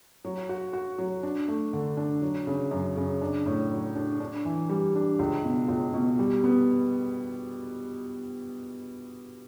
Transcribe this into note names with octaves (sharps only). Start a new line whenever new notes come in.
F#3
F#4
F#4
F#3
D4
A3
D3
D4
F#3
C#3
F#2
C#3
D4
A2
F#3
D4
D4
E3
G3
D4
C#2
B2
C#2
B2
G3
B3